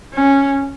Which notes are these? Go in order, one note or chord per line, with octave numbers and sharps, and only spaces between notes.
C#4